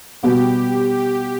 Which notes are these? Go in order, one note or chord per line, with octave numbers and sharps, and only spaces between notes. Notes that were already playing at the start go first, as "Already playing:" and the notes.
B2 G3 B3 F#4 G4
G4